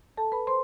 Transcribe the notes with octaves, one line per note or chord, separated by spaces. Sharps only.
A4 A5
B4 B5
C5 C6